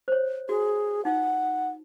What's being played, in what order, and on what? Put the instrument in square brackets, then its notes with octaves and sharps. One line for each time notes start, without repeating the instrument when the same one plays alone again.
[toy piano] C5 C#5
[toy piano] F#4 [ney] G#4
[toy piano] D#4 F4 [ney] F#5